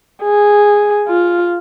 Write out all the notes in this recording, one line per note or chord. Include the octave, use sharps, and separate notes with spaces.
G#4
F4